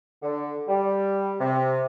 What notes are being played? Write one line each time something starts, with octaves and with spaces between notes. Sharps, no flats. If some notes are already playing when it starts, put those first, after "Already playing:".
D3
G3
C3